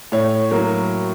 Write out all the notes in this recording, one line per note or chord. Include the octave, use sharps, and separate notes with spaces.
A2 C#5
F#3 A#3